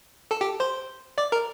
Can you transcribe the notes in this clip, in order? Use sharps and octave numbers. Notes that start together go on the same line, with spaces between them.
A4 A5
G4 G5
C5 C6
D5 D6
A#4 A#5